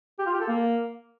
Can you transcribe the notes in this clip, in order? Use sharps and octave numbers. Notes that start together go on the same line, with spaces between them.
G4
F4
G4
A4
A#3